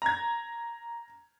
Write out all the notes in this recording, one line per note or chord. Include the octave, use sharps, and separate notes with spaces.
A#5 G#6